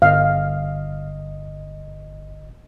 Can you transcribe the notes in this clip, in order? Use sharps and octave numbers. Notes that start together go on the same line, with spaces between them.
G1 D#5 F5